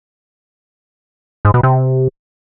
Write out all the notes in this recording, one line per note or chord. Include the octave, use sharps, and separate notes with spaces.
G#2
B2
C3